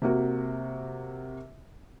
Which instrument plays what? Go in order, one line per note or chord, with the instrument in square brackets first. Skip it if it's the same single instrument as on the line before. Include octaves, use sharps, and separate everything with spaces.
[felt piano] C3 A#3 F#4